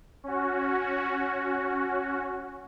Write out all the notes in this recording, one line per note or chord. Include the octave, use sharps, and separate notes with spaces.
C#4 F#4